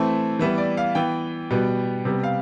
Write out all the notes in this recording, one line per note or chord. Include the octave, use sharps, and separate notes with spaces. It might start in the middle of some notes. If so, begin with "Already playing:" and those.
Already playing: E3 A3 C4
E3 G3 B3 E5
D5
F5
E3 B3 G5
B2 G3 B3
C3 G3 B3
F5